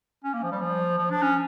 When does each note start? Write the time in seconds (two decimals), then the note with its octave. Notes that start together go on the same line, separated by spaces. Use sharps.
0.24 C#4
0.33 A#3
0.43 F3
0.52 G3
0.61 F3
0.98 F3
1.10 D4
1.22 C#4